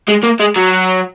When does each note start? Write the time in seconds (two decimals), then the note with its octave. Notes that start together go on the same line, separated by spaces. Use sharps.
0.08 G#3
0.23 A#3
0.40 G#3
0.56 F#3